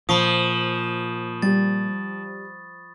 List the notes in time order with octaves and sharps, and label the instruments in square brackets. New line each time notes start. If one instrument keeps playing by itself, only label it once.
[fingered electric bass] A#2 [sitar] F3 [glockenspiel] B5 C#6 D#6
[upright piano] G3 [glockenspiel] A6